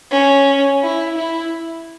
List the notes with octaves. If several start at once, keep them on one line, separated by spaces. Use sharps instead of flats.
C#4
E4
E4